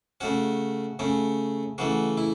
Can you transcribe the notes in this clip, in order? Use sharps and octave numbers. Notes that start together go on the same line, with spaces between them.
C#3 A3 C#4 F#4
C#3 A3 C#4
C#3 E3 A3 F#4
E4